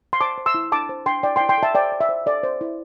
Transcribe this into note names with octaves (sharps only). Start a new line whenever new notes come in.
C6
C5 A5 D6
C5
C6 E6
E4
D4 A5 D6
C5
D4 G5 C6
E4 D5 G5
G5 C6
E4
G5 C6
A4 E5 A5
C5 D5 G5
C5
E5
C5
A4 D5
C5
E4